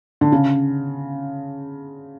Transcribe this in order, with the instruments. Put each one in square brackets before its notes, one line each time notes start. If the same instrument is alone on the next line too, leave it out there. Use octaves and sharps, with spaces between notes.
[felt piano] D3
C#3